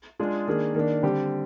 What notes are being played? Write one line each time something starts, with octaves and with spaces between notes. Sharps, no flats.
G#3 D4 F4 G#4
D#3 A#3 D4 G#4
D#3 A#3 D4
D3 G3 C4 G4